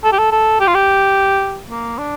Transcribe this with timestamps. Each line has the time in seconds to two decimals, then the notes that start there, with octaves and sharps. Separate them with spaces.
0.04 A4
0.12 G4
0.19 A4
0.32 A4
0.60 G4
0.67 F4
0.75 G4
1.70 A#3
1.98 D4